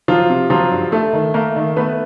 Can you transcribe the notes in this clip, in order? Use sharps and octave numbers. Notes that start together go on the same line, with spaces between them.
F3 F#3 F4
C3
F3 F#3 F4
G2
A3 A4
D#3
A3 A#3 A#4
D#3
A3 B3 B4